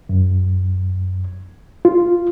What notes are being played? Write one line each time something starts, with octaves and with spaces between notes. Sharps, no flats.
F#2
F4